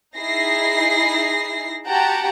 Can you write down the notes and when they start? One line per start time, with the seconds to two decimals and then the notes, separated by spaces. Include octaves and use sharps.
0.17 D#4 E4 G#4 A#6 C7
1.88 F#4 G4 F#5 G5 A5 A#5